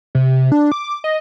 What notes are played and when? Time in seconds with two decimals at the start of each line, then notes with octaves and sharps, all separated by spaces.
0.15 C3
0.52 D4
0.72 D6
1.04 D#5